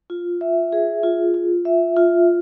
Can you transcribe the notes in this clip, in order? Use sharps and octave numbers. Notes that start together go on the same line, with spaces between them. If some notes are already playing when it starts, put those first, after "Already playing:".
F4
E5
G#4
F4
F4
E5
F4